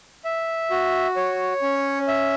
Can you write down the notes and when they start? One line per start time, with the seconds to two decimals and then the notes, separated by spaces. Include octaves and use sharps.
0.25 E5
0.71 F#4
1.16 C#5
1.62 C#4
2.08 E5